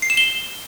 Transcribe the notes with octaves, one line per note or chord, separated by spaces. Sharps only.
C7
E7
G7